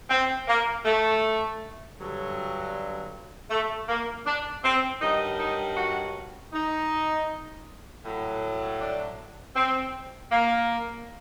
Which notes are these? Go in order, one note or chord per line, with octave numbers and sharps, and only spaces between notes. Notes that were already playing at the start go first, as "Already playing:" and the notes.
C4
A#3
A3
G2 D3 F#3
A3
A#3
D4
C4
G2 D#3 F#3 D#4
D#4
F#4
D#4
A2 F#3
D4
C4
A#3